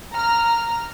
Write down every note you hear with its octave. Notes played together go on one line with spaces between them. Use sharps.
A#5 F6